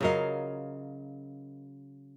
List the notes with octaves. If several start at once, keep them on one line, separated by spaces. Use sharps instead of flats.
C#3 F#3 F4 A#4 D#5 F5